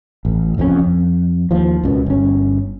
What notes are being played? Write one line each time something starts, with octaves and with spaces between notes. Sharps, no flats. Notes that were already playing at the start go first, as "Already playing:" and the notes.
A1
F#1 F2 A#2 C#4
F2
D#2 F3
C#2 F#2 B2
G1 C#4